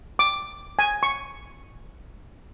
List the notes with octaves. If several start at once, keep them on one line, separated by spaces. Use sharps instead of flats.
D6
G#5
C#6